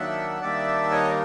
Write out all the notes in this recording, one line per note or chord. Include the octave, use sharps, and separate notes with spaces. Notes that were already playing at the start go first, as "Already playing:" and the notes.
Already playing: D#3 F#3 A#3 D4 E5 F#5
D#3 G3 A#3 D4 D5 E5
C#5 D#5